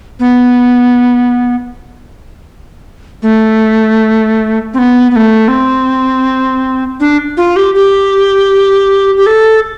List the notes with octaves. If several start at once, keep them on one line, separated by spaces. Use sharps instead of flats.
B3
A3
C4
B3
B3
A3
C4
D4
F4
G4
G4
G4
A4